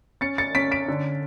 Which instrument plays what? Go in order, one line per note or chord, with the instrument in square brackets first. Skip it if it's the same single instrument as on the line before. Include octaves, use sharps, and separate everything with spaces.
[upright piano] C#4 A6 C#7
A6 C#7
C#4 B6 D7
B6 D7
D3